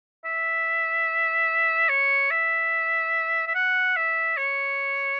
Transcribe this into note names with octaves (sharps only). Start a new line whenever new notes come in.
E5
C#5
E5
E5
F#5
E5
C#5